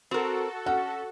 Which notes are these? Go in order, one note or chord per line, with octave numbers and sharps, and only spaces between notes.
C4 F#4 A4 A#4
C#4 F#5